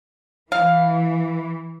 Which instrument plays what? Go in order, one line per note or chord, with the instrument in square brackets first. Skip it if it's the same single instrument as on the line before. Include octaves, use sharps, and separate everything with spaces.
[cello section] E3 [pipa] F5